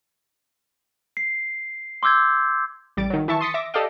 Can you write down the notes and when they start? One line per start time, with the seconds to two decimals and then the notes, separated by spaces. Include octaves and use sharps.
1.17 C7
2.03 C6 D6 E6 G6 G#6
2.97 A1 G3 A6 D7
3.10 D#3 F#3
3.28 E3 E5 A5 C#6
3.41 C6 D#6 A6 B6 C#7
3.54 E5 D6 A#6
3.74 G4 A4 D5 D#5 F5 G5